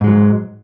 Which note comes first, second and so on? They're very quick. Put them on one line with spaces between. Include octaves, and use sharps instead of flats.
G#2 G#3 F#3